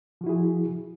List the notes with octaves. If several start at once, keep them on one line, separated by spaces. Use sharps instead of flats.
F3 E4 F#4 G#4